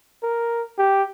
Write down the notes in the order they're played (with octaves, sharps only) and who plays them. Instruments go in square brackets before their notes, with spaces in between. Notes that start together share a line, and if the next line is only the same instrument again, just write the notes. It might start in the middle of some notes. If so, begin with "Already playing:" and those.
[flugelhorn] A#4
G4